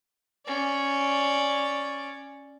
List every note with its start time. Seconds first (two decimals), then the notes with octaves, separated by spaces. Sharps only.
0.46 C#4 D5